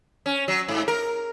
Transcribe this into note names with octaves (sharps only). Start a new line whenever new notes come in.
C#4
F#3
G#2
A#4